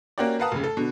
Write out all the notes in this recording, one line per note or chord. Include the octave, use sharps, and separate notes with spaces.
A#3 C#4 F#4 G4 D5
A#4 B4 F5 F#5 A5 D#6
F1 C#3
A4
B2 D3